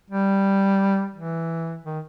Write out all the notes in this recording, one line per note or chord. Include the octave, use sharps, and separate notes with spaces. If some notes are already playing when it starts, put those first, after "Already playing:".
G3
E3
D#3